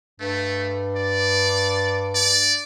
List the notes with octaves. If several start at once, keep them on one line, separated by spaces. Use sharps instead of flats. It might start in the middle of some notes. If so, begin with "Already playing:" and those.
G2 A3
D5
D5